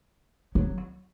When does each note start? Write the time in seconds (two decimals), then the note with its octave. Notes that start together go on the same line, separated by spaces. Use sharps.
0.55 F#3